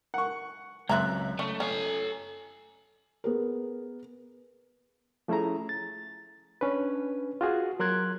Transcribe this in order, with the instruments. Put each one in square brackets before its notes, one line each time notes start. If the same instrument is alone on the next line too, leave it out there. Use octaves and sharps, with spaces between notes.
[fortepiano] F#5 C#6
[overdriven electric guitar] C#2 [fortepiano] F#2 F#6 [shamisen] C4 E5 A#5
[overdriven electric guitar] A3 [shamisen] C#4
[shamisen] C#4 [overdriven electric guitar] A4 G#5
[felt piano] B3 G#4 A#4
[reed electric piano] F3 A3 C#4 E4 G#4 A#5
A6
C#4 D4 B4
F4 F#4 G#4
F#3 A#4 C6 F#6 G#6